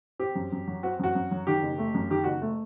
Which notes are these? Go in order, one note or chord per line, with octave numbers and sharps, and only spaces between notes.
C4 G4
F#2
F#2
F#3
C4 F#4
F#2 F#4
F#2
F#3
D#3 G4
F#1
A3
F#2
D#3 G4
F#1 F#4
A3